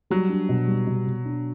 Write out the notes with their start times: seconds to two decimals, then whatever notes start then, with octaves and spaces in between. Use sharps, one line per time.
0.10 F#3 G3
0.29 D4
0.49 B2
0.68 G3
0.87 B2
1.06 B2
1.25 D4